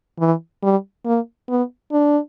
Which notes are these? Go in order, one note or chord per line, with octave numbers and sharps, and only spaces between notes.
E3
G3
A#3
B3
D4